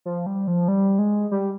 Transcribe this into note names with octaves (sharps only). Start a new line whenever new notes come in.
F3
G3
F3
G3
G#3
G3